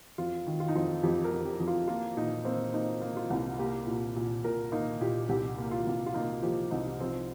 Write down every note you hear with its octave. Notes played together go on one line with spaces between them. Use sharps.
F2 F4
D#3
F4
D#4
F2 F4
F2 G4
A#4
F2
G4
F2
F4
A#3 F4
A#2 D#4
A#3 C4
A#3 D#4
A#3
F4
C2
A#3 G4
A#2
A#2
A#2 A#4
A#3 D#4
A#2 G4
C2 G4
A#3
F4
C2
F4
A#3 D#4
F3 G4
C2 D#4
F3 C4